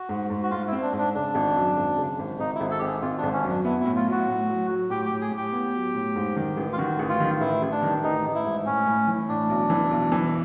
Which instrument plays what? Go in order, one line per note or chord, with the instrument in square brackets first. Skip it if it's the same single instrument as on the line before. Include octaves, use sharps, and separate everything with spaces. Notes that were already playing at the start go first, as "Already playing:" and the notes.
Already playing: [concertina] F#4
[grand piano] G#2
G#2
[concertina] F#4
[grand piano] G#2 [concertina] F4
[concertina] E4
[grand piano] C4
[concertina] D4
[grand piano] G#2
[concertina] D4
[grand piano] C#3 [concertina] D4
[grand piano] G#1
F#2
G#1
C#3
G#1
[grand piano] G#1 [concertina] D#4
[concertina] E4
[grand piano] G#1
[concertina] A4
G4
[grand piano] G#1 [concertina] G#4
[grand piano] G#1 [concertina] F4
[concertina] D4
[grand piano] G#1
[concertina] C#4
[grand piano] F#2
[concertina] D4
[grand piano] B3 [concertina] E4
[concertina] E4
[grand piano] A2
[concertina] F4
[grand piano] F#3
[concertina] F#4
[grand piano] A2
F#3
F#3
[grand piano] A2 [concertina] G4
[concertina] G4
[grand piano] A2
[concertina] G#4
[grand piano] A2
[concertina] G4
[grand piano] B3
F#3
A2
G#2
D#3
A1
[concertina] F4
[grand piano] D#3 [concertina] F#4
[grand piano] A1
[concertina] F4
[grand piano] D#3
[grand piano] A1 [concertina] E4
[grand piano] A1
[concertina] D4
[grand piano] D#3
[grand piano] A1 [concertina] D#4
[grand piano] A1
[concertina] E4
[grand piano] G#2
[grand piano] A2 [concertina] C#4
[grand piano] A2
E3
[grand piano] A2 [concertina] D4
[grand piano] B1
E3
B1
E3